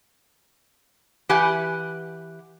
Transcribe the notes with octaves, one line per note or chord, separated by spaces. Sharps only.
E3 G4 B4 F#5 G#5